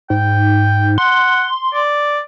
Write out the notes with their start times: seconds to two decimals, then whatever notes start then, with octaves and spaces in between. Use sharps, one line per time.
0.10 G#2 G5
0.98 F#5 C6
1.74 D5